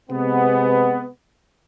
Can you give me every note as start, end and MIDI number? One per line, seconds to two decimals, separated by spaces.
0.10 1.08 48
0.10 1.08 56
0.10 1.08 59